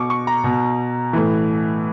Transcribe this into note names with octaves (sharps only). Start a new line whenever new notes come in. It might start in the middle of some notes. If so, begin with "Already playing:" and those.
Already playing: B2 C#6 D6
C#6
A#5
B2
A2 E3